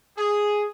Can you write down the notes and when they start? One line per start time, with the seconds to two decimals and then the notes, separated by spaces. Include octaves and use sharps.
0.16 G#4